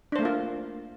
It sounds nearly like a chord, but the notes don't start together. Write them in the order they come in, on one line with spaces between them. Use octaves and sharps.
D4 C5 A3 A#3 F4